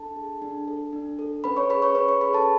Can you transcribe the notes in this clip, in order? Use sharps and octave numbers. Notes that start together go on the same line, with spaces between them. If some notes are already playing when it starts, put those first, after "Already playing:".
Already playing: D4 A4 A5
G#4
D4
A4
D4
A4
C#4 B4 B5
C#5 C#6
G#4 B4 B5
C#5 C#6
C#4 B4 B5
C#5 C#6
G#4 B4 B5
A4 A5